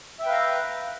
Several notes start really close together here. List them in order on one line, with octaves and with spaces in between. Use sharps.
E5 G5 B4 F5 A#5